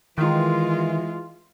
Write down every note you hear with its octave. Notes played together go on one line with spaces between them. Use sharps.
D#3 E3 G#3 F4